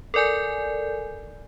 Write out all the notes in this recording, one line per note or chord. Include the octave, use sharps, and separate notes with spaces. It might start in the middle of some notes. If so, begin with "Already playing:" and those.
A4 A#4 D5 G#5 G6